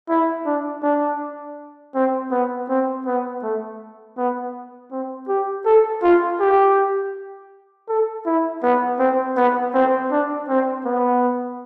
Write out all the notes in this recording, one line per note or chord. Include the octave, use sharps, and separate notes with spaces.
E4
D4
D4
C4
B3
C4
B3
A3
B3
C4
G4
A4
F4
G4
A4
E4
B3
C4
B3
C4
D4
C4
B3